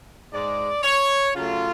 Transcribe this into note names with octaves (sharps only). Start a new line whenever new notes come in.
G#2 G#3 D5
C#5
C#3 F#3 A3 F4